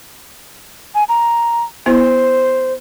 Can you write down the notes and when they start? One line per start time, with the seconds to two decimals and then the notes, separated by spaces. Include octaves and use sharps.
0.95 G#5
1.09 A#5
1.86 B3 E4 C5